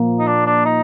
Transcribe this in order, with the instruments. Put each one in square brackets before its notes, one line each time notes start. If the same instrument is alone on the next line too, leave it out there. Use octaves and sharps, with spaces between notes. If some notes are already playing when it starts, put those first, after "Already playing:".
Already playing: [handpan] A#2 F3 A#3
[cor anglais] D#4
D4
D4
D#4